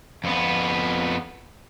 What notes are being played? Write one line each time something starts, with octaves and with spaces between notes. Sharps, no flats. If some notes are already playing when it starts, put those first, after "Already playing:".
F2 B3